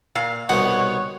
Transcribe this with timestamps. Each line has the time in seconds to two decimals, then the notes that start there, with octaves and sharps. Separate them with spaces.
0.15 A#2 F5
0.49 C2 B2 D#4 C#5 F#5